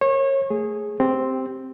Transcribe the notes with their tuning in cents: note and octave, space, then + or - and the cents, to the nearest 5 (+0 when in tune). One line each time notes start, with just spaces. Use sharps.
A#4 +0 C#5 -30
A3 +10 G#4 +0
C4 +0 G4 +0